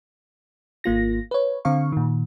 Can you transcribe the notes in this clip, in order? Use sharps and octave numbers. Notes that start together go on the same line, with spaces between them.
G#1 A#3 F4 A#6
B4 C#5
D3 C4 F5 C#6
A#2 D#3